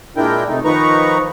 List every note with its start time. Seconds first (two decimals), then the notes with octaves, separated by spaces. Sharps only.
0.17 A#2 G#3 D4 E4 A#4 G5
0.48 C3 A3 D#4
0.64 D#3 F3 D#4 B4 A#5 C#6